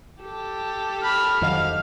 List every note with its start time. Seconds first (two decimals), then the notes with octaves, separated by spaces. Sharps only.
0.22 G4 A4
1.03 B5 F6
1.42 F2 D#3 F#3 F5